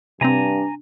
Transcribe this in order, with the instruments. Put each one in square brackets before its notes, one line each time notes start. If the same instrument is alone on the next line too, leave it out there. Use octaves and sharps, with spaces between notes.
[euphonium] G2 [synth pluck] C3 C4 [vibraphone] D4 [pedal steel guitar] G#5 A#5